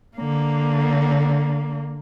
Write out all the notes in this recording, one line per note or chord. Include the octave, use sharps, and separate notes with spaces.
D3 A#3